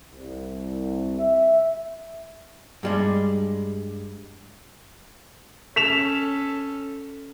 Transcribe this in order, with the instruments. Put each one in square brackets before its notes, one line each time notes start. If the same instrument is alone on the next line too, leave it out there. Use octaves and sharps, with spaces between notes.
[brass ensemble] C2
E5
[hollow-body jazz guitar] G2 G3 G#3
[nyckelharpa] C#4 A4 [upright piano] B6 E7 F7